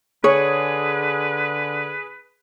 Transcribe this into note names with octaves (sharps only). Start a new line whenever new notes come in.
D3 G#4 B4 C#5